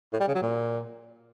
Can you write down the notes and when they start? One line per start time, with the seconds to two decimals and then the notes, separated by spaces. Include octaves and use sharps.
0.13 A2
0.21 G3
0.28 C#3
0.35 F#3
0.43 A#2